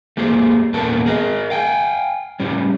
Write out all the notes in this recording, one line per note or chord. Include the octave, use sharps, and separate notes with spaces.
A3 A#3 G4 G#4 C5
E2 A#2 B3 A4 A#4 A5
G#4 A#4 D#5
F5 G5 G#5
A2 G3 C#4